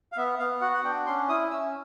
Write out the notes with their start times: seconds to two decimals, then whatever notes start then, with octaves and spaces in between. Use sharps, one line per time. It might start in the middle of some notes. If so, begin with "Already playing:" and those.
0.12 F5
0.17 B3 E5
0.39 B3 F5
0.61 F#4 F#5
0.74 F#5
0.84 D4 G5
1.06 C#4 C6
1.28 E4 D#6
1.51 C#4 E6